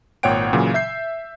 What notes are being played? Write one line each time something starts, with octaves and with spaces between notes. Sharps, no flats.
G#1 A#2 C#5 F#5 G5 D7
A#2 C#3 E3 F#3
E5 G6 C7